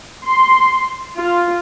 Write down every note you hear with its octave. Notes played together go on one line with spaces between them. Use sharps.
C6
F4